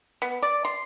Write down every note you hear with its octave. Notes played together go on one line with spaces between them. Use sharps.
B3
D5
C6